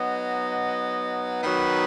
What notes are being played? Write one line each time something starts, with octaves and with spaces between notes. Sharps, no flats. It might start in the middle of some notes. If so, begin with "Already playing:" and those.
Already playing: F#3 B3 D#4 D#5
D#3 F#3 B3 B4